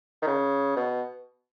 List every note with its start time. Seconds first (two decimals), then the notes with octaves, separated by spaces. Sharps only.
0.22 D#3
0.27 C#3
0.76 B2